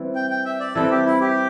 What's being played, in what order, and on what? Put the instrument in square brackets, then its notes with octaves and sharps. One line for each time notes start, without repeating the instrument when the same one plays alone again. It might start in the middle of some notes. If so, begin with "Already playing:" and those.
Already playing: [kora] E3 G3 C4
[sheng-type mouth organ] G5
G5
E5
D5
[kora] E3 G3 C4 [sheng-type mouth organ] A4
[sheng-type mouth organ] G4
E4
G4